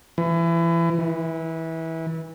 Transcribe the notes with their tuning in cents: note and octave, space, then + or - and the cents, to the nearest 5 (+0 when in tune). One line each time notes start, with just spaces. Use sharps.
E3 +30
E3 -20